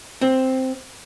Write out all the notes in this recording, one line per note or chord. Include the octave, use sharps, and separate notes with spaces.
C4